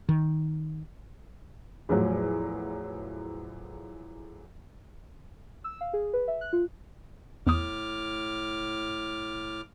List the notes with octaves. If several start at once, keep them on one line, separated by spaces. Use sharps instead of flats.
D#3
E2 A2 F3 F#3
E6
F5
G#4
B4
E5
F#6
F4
E2 A2 D6 D#6 F6